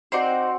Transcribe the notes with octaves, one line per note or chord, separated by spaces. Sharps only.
C4 D#4 F#4 C5 D5